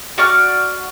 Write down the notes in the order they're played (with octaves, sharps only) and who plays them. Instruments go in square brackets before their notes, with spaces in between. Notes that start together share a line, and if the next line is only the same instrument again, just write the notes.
[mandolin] F#4 D5 C#6 F6